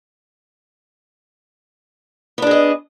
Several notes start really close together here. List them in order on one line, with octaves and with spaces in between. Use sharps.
B3 D4 G#4 D#5